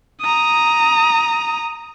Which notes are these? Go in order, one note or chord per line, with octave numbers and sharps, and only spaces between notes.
A#5 D#6